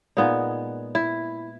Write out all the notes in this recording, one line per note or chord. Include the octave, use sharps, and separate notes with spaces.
A#2 G#3 B3 D#4
E4